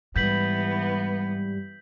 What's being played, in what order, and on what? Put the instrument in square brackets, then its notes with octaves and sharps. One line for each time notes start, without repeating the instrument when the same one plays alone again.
[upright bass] G#2 [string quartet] E3 B3 [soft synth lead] G3 [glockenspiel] G6 B6 F#7